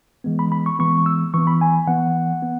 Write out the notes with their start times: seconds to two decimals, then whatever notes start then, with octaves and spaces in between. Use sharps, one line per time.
0.24 E3 G#3 B3
0.39 B5
0.52 B5
0.66 C#6
0.79 E3 G#3 B3 C#6
1.06 E6
1.34 E3 B3 C#6
1.47 B5
1.61 G#5
1.88 E3 B3 F#5
2.43 B3